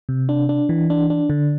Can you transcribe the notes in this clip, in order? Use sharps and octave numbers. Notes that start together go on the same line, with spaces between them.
C3
D4
D4
E3
D4
D4
D3